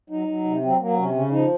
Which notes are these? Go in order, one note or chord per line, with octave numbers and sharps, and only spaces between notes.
F#3 D#4
F#3
C3
F#3 C4
F#3 A#3
C3 C#4
C#3 C#4
F3 D#4